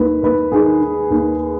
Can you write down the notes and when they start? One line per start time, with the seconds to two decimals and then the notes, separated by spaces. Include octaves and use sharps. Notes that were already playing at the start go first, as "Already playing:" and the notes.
Already playing: D#2 D#3 B4
0.23 D#2 B4
0.52 D#3 G#4
0.81 D#3
1.10 D#2